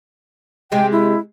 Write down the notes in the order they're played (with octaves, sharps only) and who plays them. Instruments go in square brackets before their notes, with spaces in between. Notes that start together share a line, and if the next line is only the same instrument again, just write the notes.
[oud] C3 G#3 [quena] G5
[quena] E4